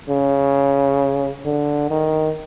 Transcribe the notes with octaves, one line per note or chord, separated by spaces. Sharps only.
C#3
D3
D#3